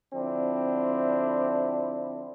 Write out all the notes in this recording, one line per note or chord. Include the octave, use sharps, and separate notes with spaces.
D3 F3 C4 D4 E4